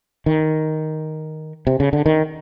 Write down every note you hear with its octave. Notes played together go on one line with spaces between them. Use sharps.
D#3
C3
C#3
D3
D#3